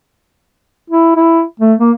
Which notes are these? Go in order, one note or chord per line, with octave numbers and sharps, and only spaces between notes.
E4
E4
A3
A#3